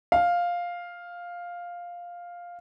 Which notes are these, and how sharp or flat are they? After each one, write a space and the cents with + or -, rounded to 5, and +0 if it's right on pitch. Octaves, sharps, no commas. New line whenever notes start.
F5 +5